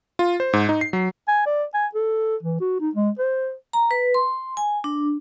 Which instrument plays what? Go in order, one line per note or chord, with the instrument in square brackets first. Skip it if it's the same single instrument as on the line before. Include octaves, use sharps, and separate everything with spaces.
[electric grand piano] F4
C5
G#2
D#4
C7
F#3
[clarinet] G#5
D5
G#5
A4
E3
F#4
D#4
G#3
C5
[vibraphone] A#5
B4
C6
G#5
D4